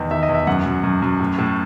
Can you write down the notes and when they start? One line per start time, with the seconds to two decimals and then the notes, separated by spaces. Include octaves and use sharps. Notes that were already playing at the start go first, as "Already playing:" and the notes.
Already playing: E2 D#3
0.11 D#3 E5
0.23 D#5
0.29 E2
0.34 E5
0.47 F#2 F#5
0.66 F#2
0.84 F#2
1.02 F#2
1.20 A2
1.38 A2